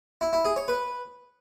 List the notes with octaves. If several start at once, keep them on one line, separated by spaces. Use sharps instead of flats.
E4
E4
G#4
C#5
B4